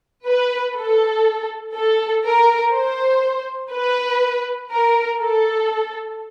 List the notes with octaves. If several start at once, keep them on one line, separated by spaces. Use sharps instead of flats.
B4
A4
A4
A#4
C5
B4
A#4
A4